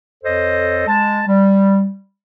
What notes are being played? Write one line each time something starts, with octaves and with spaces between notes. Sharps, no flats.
F2 A4 C5 C#5 D#5
G#3 A5
G3